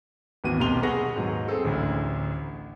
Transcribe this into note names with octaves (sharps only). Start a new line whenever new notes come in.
G#1 D#2 E3 B3 F#4 D#7
B1 C3 A#3 C6 F7 G7
G#4 B4 F#5 A5 C#6 A#6
D#2 G#2 F#3
C4 G#4 A4 C5
A1 D2